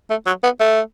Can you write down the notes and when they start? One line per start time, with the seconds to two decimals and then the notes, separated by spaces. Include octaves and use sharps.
0.10 A3
0.26 F#3
0.43 B3
0.60 A3